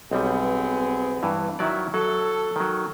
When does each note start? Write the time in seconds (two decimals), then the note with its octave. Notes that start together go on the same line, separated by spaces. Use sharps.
0.11 B1 G3 B3 C4 G#4
1.23 G2 E3
1.59 D#3 F#3 E4 D5
1.94 F#3 A4
2.56 D#3 F#3